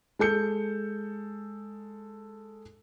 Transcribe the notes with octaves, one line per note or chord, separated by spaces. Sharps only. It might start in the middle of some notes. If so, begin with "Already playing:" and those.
G#3 A4 G6 C#7